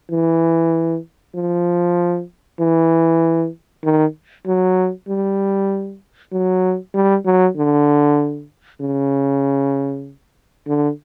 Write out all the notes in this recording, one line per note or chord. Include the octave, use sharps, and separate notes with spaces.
E3
F3
E3
D#3
F#3
G3
F#3
G3
F#3
D3
C#3
D3